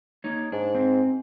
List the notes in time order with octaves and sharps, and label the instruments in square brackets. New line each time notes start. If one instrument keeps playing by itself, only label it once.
[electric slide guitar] A#3 D#4 C#5
[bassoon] G#2 [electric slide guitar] D4
[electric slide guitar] C4